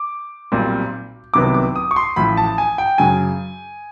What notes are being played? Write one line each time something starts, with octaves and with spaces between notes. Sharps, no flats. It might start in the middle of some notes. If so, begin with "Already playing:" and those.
Already playing: D6
B1 A#2 G3 C4
C2 C3 D#3 F#3 B3 D6
D6
D#6
C#6
C6
A1 A2 F3 B5
A5
G#5
G5
F#2 C#3 F#3 G#5